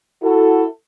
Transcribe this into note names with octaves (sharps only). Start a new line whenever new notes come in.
E4 F#4 A4